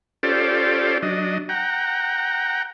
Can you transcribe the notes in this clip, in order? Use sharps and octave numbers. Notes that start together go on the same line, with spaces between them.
C#4 F4 G4 A4 C5 D5
F#3 D4 D#5
F#5 G5 A#5